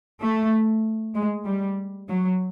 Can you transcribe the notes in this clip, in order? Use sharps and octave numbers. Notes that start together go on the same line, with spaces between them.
A3
G#3
G3
F#3